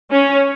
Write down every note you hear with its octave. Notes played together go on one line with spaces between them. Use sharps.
C#4